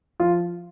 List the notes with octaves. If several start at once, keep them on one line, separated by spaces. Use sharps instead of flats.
F3 F4